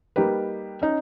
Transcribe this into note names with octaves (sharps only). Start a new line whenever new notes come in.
G3 A#3 D#4 G4 B4
C#4 D#4